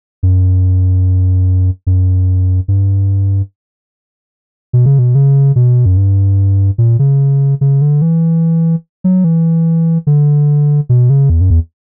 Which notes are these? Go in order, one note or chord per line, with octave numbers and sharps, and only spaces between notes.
F#2
F#2
G2
B2
C#3
B2
C#3
B2
F#2
G2
A#2
C#3
C#3
D3
E3
F#3
E3
D3
B2
C#3
E2
F#2
E2